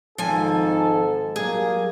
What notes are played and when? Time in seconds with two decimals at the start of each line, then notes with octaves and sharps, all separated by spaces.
0.18 G#1 G#2 F3 A4 G#5
1.36 F#3 G3 A#3 G#4